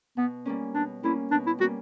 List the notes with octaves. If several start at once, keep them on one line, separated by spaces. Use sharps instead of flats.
B2 B3
G3 A#3 C#4
B2 D4
G3 A#3 C#4 E4
B2 D4
E4
G3 A#3 C#4 F#4